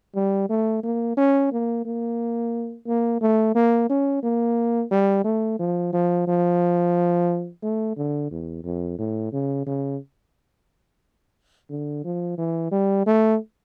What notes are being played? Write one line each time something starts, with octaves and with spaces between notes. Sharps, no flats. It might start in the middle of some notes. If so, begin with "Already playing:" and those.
G3
A3
A#3
C#4
A#3
A#3
A#3
A3
A#3
C#4
A#3
G3
A3
F3
F3
F3
A3
D3
E2
F2
A2
C#3
C#3
D3
F3
E3
G3
A3